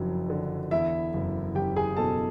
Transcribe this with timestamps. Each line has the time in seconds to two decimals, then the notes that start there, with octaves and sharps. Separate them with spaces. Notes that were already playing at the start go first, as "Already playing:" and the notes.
Already playing: F#1 F2 F#3 D4
0.30 D3
0.71 E2 E4 E5
1.14 F#1
1.55 F#1 G4 G5
1.76 G#4 G#5
1.96 B2 A4 A5